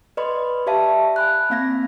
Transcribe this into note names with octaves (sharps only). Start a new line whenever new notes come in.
B4 D5 D#5 B5 C6
G4 D5 E5 F5 A5
G#5 B5 F#6
A#3 C4 F5 G#6 A#6